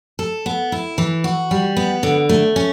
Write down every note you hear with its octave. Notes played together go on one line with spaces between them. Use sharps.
A4
B3
E4
E3
F#4
G3
B3
D3
A3
C#4